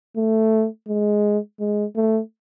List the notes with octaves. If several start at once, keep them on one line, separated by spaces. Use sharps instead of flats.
A3
G#3
G#3
A3